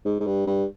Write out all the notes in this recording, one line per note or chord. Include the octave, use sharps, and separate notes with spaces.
G#2
G#2
G2
G2